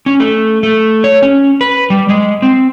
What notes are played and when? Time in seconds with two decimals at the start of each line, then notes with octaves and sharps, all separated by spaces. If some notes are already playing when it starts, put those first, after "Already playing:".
0.06 C#4
0.20 A3
0.63 A3
1.04 C#5
1.22 C#4
1.61 B4
1.90 G3
2.09 G#3
2.42 C4